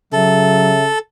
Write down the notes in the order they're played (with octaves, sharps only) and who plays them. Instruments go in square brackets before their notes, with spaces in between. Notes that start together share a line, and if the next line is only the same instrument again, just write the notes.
[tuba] C#3 [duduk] F#3 [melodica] A4 [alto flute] E5